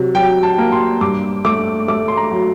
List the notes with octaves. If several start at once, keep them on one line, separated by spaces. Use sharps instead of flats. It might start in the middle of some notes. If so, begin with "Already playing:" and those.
Already playing: C3 F#3
F#3 G5
A5
A#3
C6
G2 D6
A3 D6
A3 D6
C6
A#5
F#3